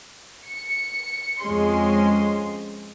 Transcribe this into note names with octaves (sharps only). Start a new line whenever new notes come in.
C#7
F2 G#3 C#4 C6